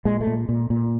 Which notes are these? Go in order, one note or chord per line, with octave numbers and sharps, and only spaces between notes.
A#2 G#3
A3
A#2
A#2
A#2